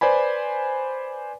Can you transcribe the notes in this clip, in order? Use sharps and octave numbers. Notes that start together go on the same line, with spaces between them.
B4 C5 D5 G#5 B5